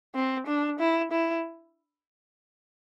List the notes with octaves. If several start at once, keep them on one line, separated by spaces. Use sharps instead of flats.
C4
D4
E4
E4